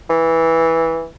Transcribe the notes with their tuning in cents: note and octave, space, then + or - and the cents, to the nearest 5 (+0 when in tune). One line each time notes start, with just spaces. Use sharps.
E3 -10